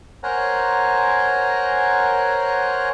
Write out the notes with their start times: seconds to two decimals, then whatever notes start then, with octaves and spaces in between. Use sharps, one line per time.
0.24 A#4 C5 C#5 F#5 G#5 A#5